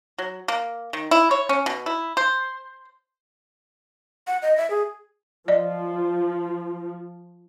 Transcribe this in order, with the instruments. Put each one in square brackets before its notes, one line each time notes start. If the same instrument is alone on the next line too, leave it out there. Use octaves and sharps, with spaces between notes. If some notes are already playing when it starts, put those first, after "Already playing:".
[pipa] F#3
A#3
D#3
E4
C#5
C#4
B2
E4
C5
[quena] F#5
D#5
E5
G#4
[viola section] F3 [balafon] D5 D#5